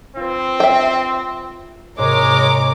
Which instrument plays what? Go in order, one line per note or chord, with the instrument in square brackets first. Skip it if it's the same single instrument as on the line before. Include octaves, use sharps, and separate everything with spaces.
[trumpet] C4 [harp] F4 B4
[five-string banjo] E5 G5
[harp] G#1 C3 C#6 [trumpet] G#3 [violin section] A#4 C#5 D6